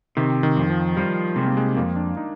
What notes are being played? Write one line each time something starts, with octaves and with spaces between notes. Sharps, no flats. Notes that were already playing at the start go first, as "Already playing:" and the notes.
C3 D#3
D#3
F2
F3
F3 G3
C3 G#3
A#3
G#3
F2 A#3
D4
D#4